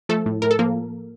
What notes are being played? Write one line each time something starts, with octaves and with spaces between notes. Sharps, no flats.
F3 A3 A4
A2
A2 A#4
A4
F3 A#3 A#4